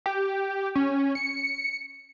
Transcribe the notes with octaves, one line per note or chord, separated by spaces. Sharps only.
G4
C#4
C#7